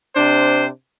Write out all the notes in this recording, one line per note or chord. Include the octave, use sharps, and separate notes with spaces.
C3 D4 C5